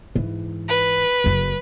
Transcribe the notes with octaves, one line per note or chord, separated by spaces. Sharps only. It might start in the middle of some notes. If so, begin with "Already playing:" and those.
G#2 E3
B4
F#1 F#2